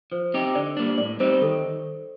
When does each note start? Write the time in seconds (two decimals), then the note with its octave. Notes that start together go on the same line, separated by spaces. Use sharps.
0.12 F3 C5
0.34 C4 D#4 G4
0.55 D3 D5
0.77 G3 A#3 D4
0.98 A2 D5
1.20 G3 C4 D#4 C5
1.41 D#3 A4